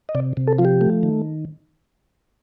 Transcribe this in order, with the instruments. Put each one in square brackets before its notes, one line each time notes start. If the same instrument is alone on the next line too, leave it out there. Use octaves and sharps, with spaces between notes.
[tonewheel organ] D#5
C3 D5
C3
A4
F3 F4
G4
A3
D#3